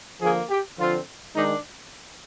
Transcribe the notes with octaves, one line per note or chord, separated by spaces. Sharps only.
D3 F3 A#3 G#4
G4
D3 F3 C4 F4
D#3 G#3 D4 D#4